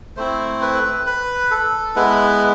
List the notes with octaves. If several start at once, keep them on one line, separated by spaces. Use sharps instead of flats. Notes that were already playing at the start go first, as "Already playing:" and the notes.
A3 C4 E4 C5
B4
B4
A4
G#3 B3 E4 B4